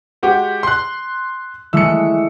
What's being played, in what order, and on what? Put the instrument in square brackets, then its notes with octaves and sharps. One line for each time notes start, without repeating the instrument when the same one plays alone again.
[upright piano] G#3 F#4 G4
C6 F#6
[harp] E3 G#3 A3 [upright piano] E6 C#7